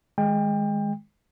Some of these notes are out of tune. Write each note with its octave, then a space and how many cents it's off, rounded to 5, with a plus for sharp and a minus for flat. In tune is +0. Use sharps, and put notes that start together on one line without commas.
D#3 +5 G#3 +0 G5 +30